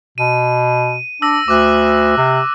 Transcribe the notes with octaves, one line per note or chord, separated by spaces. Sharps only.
B2 D#7
D4 E6 A#6
D2 D6 F#6
C3